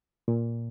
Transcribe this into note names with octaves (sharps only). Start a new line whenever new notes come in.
A#2